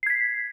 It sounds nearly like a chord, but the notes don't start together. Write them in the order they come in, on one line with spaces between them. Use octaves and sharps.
C7 G#6 B6